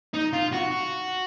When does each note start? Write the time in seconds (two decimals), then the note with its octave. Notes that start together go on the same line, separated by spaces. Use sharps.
0.14 D#4
0.33 F4
0.53 F#4